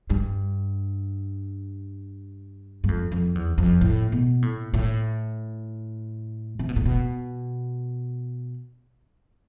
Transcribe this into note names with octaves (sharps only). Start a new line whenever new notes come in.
G2
G2
F2
F2
E2
F2
A2
B2
A2
A2
C3
B2
A2
B2